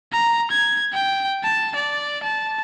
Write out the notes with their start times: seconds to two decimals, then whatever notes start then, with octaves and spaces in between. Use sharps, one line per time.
0.12 A#5
0.51 G#6
0.93 G5
1.44 A5
1.75 D5
2.23 A5